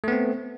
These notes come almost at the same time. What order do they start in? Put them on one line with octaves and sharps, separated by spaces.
A3 B3 C4